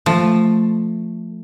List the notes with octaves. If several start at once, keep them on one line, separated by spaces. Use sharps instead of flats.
F3 A3